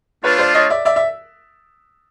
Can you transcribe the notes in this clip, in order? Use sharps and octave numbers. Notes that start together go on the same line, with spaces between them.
A3 D4 F4 B4 C#5
C5 D5
C#5 D#5
D5 E5
D5 E5
E5